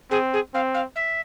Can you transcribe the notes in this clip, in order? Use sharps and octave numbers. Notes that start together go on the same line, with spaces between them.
C4 G#4
G#4
C4 F5
F5
E5